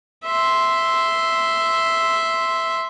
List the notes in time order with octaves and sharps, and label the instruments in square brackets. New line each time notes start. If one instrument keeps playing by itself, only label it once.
[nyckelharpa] E5 C6